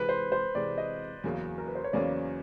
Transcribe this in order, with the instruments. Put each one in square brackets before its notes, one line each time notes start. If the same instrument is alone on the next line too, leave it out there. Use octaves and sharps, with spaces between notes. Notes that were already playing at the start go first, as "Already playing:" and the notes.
Already playing: [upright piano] C3 E3 G#3 C4 [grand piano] B4
[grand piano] C5
C5
[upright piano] C3 E3 G#3 C4 [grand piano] D5
[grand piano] D#5
[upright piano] E2 C#3 F#3 A#3 C#4
[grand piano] A#4
B4
C5
C#5
[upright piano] E2 C#3 F#3 A#3 C#4 [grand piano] D5